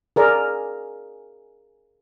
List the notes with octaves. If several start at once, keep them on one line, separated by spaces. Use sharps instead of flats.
G#4 A#4 D5